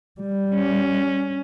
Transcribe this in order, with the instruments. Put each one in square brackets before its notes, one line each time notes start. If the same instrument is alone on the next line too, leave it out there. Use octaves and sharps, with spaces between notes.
[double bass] G3
[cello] C#4